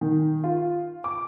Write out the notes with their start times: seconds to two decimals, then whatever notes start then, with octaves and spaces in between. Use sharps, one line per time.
0.01 D#3
0.44 F4
1.04 D6